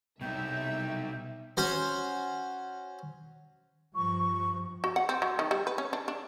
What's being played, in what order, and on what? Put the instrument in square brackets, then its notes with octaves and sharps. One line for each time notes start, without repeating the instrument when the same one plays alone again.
[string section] C2 E5 [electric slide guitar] B2 D#4 [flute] G5
[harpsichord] C#4 F#4 C5
[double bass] G2 F3 [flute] C#6
[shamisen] F#4
F#5
C4
F#3
D#3
G3
B4
C#4
D4
D4